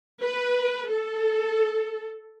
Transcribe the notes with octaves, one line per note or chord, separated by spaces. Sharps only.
B4
A4